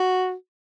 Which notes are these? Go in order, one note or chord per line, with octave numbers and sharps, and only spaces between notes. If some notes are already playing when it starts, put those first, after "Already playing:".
Already playing: F#4